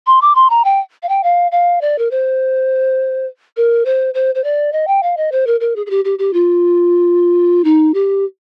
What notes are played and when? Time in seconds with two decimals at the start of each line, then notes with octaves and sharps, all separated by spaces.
0.07 C6
0.22 D6
0.35 C6
0.50 A#5
0.65 G5
1.03 F5
1.09 G5
1.23 F5
1.52 F5
1.81 D5
1.99 A#4
2.11 C5
3.57 A#4
3.85 C5
4.14 C5
4.35 C5
4.44 D5
4.73 D#5
4.87 G5
5.03 F5
5.17 D#5
5.32 C5
5.47 A#4
5.60 A#4
5.76 G#4
5.86 G#4
5.90 G4
6.05 G4
6.19 G4
6.33 F4
7.64 D#4
7.94 G4